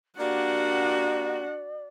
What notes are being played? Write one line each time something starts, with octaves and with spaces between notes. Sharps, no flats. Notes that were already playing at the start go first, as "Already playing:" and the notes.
A#3 D4 F#4 G4 D5 F#5